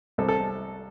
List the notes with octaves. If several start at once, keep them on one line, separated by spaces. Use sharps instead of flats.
C2 A4
A4